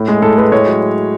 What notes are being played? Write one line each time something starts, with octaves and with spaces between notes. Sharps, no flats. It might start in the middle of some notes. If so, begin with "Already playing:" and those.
Already playing: A2
G#3
A2 A4
G#3 B4
A2 C#5
F#3